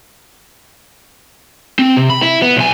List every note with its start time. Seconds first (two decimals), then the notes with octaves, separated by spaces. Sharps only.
1.79 C4
1.97 C3
2.10 B5
2.23 E4
2.42 B3
2.57 B1 G#5